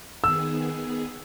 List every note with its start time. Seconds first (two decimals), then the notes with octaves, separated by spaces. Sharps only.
0.24 D#3 B3 G#4 E6